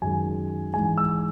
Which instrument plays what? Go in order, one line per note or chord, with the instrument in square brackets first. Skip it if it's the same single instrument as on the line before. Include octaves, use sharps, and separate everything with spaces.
[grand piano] F#2 D#3 G#3 G#5
G#2 E3 G#3 G#5
E6